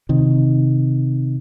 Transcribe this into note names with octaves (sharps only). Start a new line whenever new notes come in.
C3 D#3